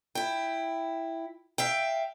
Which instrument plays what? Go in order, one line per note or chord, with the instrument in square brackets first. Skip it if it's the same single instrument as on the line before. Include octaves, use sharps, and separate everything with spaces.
[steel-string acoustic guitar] E4 G5
E5 F5 G5